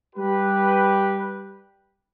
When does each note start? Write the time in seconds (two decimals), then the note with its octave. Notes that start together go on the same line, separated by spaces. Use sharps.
0.16 G3 G4 B4